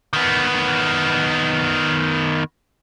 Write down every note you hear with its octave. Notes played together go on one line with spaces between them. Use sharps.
D#3 B3